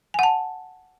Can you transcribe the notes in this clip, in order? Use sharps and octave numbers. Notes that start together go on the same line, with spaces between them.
F#5 G#5 A5